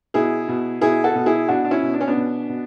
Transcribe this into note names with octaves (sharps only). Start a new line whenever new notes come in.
B2 E4 G#4
B2
B2 E4 G#4
F#4 A4
B2
E4 G#4
B2 D4 F#4
D4
C#4 E4
B2
D4
C#4
B3 D4
B2
B2